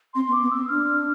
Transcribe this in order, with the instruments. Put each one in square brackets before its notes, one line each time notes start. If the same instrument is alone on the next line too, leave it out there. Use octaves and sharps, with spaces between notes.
[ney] C4 [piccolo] C6
[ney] B3
[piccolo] D6
[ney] B3
[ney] C4 [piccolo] E6
[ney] D4 [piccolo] F6